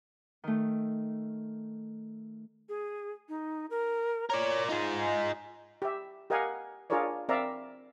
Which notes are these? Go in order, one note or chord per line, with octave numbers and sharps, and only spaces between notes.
D#3 A3
G#4
D#4
A#4
A#4 C#5 D5
D#4 F4 G#4
G4 E5
G4 A#4 D#5 F5 F#5 G#5
D4 F4 G#4 A#4 C#5 D5
C4 A#4 D5 E5 F5 A#5